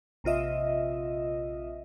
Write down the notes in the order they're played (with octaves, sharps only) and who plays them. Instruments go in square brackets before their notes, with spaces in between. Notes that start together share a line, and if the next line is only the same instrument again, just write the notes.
[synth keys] A#1 C3 F4 D#5 E5